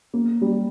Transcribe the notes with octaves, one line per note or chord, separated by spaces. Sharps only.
A#3
G3